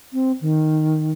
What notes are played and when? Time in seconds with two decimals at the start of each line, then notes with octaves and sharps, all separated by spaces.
0.13 C4
0.41 D#3